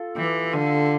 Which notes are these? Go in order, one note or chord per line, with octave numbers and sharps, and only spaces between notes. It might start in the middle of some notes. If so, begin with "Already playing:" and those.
Already playing: F4 A4
E3 G4
D3 F4